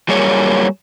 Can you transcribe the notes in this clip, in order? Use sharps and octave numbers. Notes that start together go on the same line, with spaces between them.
F#3 G3 A#3 G#4 C#5